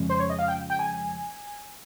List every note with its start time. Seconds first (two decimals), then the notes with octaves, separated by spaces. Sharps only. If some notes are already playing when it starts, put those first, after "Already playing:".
Already playing: F2 C#3 F3 G#3 C#4
0.10 C5
0.19 C#5
0.30 D#5
0.39 F5
0.48 G5
0.70 G5
0.79 G#5